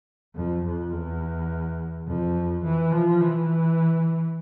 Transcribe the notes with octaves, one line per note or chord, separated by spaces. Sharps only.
F2
F2
E2
F2
E3
F3
E3